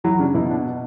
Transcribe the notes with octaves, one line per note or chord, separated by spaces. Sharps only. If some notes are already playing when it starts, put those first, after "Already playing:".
F#3 E4
C#3 D4
B2 E4
D4